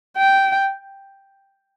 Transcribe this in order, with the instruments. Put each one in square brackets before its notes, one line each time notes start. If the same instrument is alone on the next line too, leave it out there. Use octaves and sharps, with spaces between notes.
[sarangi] G5